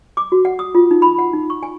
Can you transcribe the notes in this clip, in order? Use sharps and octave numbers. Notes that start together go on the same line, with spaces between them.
D6
F#4
F#5
D#6
F4
D#4
B5
F#5
D#4
C#6
G#5